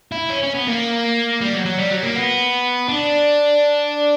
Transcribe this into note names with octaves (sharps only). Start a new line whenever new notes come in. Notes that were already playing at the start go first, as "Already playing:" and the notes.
E4
C#4
C#4
B3
A#3
G3
F#3
F#3
G3
F#3
A#3
B3
D4